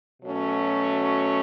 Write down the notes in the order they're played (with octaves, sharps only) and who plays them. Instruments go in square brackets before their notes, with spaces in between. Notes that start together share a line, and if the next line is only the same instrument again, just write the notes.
[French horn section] B2 F#3 A3 C#4